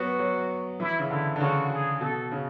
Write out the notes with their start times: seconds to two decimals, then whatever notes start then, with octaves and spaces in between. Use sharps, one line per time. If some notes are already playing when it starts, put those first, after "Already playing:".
Already playing: F#3 B3 F#4
0.19 F#3
0.80 E3 E4
0.99 C#3
1.10 D3 E4
1.36 D3
1.40 C#3 F#4
1.71 G#4
2.01 B2 A4
2.32 C#3